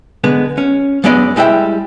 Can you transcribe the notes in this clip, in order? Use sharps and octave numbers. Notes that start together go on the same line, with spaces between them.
D3 G#3 B3
C#4
F#2 G#3 B3 D4 D5 D#5
G3 G#3 E4 E5 G5